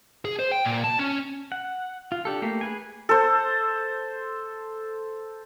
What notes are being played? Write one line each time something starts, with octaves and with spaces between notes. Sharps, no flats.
G#4
C5
G5
A#2
A5
C#4
F#5
F4
D4 G4 A4
A3 A#3 G4
G#4 B4 G#5
A4 C5